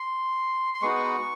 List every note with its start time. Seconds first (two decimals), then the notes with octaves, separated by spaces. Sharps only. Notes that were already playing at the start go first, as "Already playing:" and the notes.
Already playing: C6
0.74 C6
0.82 G#3 B3 D#4 F#4 C#6